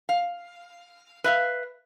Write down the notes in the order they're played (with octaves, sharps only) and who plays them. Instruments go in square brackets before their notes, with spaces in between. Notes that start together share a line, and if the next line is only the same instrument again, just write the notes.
[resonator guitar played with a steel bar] F5
B4 E5 F5